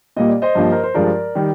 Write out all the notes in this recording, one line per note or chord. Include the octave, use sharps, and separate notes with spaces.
A#2 G3 A#3 D#5
D5
C5 D#5
G2 F3 A#3
A#4
C5
G2 F3 G#3 A#4 D5
D#3 G3